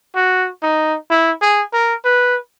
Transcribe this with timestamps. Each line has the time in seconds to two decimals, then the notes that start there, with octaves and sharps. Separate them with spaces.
0.15 F#4
0.63 D#4
1.10 E4
1.41 G#4
1.73 A#4
2.04 B4